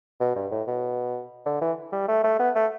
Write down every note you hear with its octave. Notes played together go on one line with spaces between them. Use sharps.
B2
G2
A2
B2
D3
E3
G3
A3
A3
B3
A3